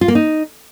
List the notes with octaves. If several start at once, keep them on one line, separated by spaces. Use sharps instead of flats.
F4
A#3
D#4